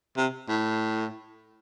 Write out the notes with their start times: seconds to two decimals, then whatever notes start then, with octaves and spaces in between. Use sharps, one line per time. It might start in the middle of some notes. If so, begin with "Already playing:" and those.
0.17 C3
0.49 A2